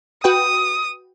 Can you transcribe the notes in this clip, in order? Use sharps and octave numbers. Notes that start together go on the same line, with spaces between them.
F#4 B4 G5 D#6